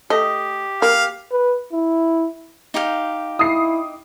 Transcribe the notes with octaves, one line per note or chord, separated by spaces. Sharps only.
A3 G4 D#5
A#3 F5
B4
E4
D#4 G4 F5
E4 D#6 C7